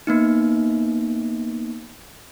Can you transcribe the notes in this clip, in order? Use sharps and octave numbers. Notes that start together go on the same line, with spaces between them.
A#3 B3 D#4